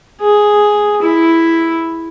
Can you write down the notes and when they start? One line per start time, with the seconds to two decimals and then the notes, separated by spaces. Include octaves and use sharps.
0.21 G#4
1.02 E4